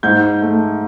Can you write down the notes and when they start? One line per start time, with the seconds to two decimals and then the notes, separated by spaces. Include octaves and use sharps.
0.03 G#2 G6
0.42 A3